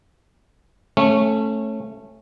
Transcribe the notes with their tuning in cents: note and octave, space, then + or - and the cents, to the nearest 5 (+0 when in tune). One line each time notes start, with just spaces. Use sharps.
A3 +0 C#4 -20